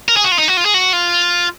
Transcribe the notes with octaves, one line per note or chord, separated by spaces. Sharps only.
A#4
G#4
F#4
F4
D#4
F#4
F4
G#4
F#4
F4